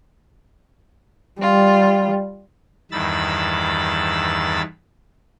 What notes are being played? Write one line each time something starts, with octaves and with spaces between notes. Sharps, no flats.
G3 F4
E2 G2 D#3 B5 E6 A6